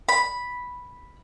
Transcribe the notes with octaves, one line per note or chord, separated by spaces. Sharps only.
B5